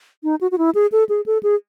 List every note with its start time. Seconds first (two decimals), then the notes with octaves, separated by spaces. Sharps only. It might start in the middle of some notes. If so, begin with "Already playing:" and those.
0.24 D#4
0.41 F#4
0.51 F#4
0.58 E4
0.75 G#4
0.92 A4
1.09 G#4
1.26 A4
1.43 G#4